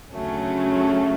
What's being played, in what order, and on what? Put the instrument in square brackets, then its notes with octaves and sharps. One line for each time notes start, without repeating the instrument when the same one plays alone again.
[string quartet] D2 C#3 F#3 A3 C#4